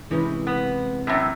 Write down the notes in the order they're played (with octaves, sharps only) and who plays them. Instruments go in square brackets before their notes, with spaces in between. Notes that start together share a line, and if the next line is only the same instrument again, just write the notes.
[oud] C3 G#3 C#4 [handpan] E3 E4 B4
[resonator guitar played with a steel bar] B3
F#2 A2